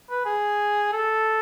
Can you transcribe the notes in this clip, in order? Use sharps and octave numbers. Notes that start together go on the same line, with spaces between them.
B4
G#4
A4